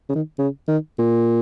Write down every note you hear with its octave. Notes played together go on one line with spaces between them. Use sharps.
C#3
D#3
C#3
D#3
A#2